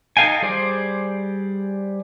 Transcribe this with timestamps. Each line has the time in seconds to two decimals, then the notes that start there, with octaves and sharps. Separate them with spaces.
0.17 D#4 A4 F5 G5 G#5
0.42 G3 G#4 C5 D5